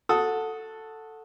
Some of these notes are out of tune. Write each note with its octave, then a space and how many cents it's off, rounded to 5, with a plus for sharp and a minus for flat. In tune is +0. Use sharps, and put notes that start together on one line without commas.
F#4 -15 A4 +5 D#6 +10